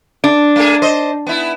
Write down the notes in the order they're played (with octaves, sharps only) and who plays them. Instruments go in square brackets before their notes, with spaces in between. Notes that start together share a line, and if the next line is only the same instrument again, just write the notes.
[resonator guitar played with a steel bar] D4
[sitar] A3 A#3 G#4
C5 D#5
B3 E4